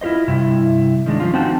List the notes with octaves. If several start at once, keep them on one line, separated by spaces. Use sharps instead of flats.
E4 F4 G4 C5 D#5
G2 C3 E4
D#3 G#3 D4
F3 C#4 F4
C4 D#4 F#4 G5 A5